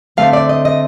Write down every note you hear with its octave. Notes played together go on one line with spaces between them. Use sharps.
D3 A3 C4 F5
D5
D#5
D#5